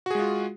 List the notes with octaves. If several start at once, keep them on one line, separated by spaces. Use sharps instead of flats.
G#3 F4 F#4 G#4